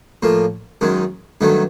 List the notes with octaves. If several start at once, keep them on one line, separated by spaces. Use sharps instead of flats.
A2 F3 A#3
F#2 D#3 G#3
G2 D#3 F#3 A3